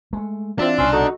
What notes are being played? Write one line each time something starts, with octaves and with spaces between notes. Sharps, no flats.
G#3 A3
E3 C4 D4 F4 E5
C2 B2 C#4 C6 E6
D3 D#4 F#4 A4 D#5